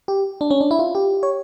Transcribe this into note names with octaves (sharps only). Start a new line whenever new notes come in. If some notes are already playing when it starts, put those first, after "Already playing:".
G4
D4
C#4
D4
E4
F4
G4
C#5